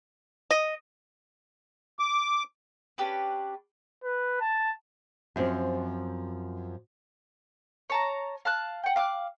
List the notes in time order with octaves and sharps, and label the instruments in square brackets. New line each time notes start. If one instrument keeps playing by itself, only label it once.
[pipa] D#5
[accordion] D6
[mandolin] C#4 D4 G4 B4
[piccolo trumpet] B4
A5
[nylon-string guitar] F#2 F3 C4
[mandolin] C#5 A5 A#5
F5 A5 F#6
F#5 G5
F5 D6 E6 F#6